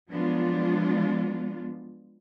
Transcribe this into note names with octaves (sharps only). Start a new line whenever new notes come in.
F3 F#3 G#3 B3 D4 F4